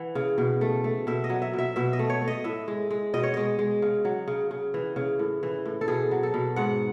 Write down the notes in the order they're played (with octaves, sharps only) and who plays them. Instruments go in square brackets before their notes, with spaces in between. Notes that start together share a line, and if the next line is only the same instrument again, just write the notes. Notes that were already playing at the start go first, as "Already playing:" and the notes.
Already playing: [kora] E3 F#5
C#3
B2
A3
A3
B2 E5
D#5
F#3
E5
B2
E5
B2 E5
D#5
A3
C#5
A3
D#5
A2 E5
G#3
G#3
B2 D#5
C#5
G#3 D#5
G#3
C#3
F#3
C#3
C#3
E3
C#3
A2
E3
A2
A4
B2 G#4
F#3
A4
B2
G#2 F#5